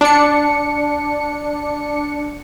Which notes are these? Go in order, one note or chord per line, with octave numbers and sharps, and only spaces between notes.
D4 C#7